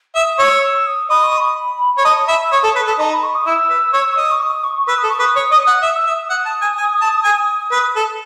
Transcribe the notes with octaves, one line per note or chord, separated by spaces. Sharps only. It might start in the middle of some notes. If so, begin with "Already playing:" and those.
E5 D#6
C#5 E6
E6
D#6
D#5 B5
C#6
B5
C#5 B5
D#5 A5
E5 B5
E6
C#5 D#6
A4
B4
A4
D#4 A5
B5
C#6
D#6
E4 E6
B4
C#5
D#5
C#6
D#6
C#6
B4 E6
D#6
A4
C#6
B4 D#6
C#5
D#5
F#5
E5 D#6
E6
E5
D#6
F#5 D#6
A5
G#5
G#5
A5
G#5
B4
A4